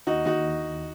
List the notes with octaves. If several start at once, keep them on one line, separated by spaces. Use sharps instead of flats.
D#2 D#4 F#4
D#2 D#4 F#4